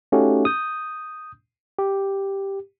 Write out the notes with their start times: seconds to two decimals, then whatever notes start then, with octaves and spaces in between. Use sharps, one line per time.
0.12 A3 C#4 D#4 F#4 G4 A4
0.45 D#6 G6
1.78 G4